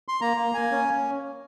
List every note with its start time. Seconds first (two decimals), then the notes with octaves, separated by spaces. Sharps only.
0.08 C6
0.21 A#3 A#5
0.37 A#3
0.54 A#3 G#5
0.71 C#4